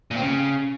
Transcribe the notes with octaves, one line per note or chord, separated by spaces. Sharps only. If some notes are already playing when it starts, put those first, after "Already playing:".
A#2
C4
C#3